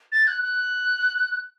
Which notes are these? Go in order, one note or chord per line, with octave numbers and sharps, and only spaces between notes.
A6
F#6
F#6